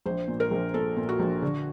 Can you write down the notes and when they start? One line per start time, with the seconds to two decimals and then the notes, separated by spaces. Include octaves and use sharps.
0.06 A#1 C5
0.28 A#2
0.40 A#4
0.51 A#1
0.74 A#2 A4
0.96 A#2
1.09 F#4
1.20 A#1
1.42 D3